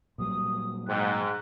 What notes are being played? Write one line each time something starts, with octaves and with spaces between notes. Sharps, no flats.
A#2 F#3 G3 D#6
G#2 G5 F#6